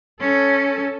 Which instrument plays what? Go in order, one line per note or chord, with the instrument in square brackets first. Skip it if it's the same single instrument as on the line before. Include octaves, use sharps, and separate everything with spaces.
[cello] C#4 A4